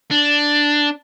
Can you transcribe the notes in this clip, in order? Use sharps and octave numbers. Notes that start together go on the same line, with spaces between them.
D4